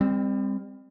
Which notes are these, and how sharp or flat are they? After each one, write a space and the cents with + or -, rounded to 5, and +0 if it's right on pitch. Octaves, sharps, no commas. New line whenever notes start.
G3 +40 C4 +0